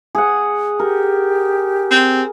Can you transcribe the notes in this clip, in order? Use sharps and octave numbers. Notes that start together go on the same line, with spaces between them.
G#4 F#5
G4 A#4
C4